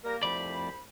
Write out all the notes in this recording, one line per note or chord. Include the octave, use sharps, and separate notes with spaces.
G3 A#3 A#4
C2 F2 A3 C5 D5 B5